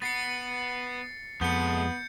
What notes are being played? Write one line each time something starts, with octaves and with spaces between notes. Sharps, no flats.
B3 A6 C7 C#7
F2 G#3 A3 B3 G6 C#7